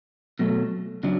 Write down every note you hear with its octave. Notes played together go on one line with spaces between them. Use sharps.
B2 F#3 A3
C#3 F#3 D4